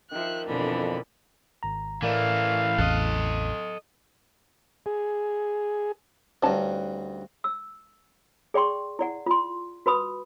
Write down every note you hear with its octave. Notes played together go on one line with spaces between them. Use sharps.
D#3 F3 A#4 E5 F#6
F2 B2 D3 E3 D4 B5
G#1 A#5
A2 E3 A3 A#4 D5 F5
A1 E2 A4 D#5 F#6
G#4
D2 G2 C#4 D#4 A5
E6
G#4 D5 G5 C6 C#6
E4 D5 F#5
F4 C6
F#4 B4 B5 D#6